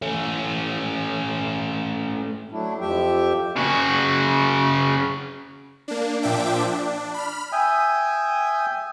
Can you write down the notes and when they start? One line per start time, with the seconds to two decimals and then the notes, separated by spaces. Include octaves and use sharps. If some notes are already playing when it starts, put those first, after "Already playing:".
0.02 A3 C#4
2.52 F#3 A3 D4 E4
2.80 F2 F3 G4 E5 G5
3.56 C#3 F#4
5.88 A#3 D4
6.22 A#2 F3 D4 E5 G5 D6
6.67 D4
7.14 B5 F6
7.52 E5 G5 G#5 D#6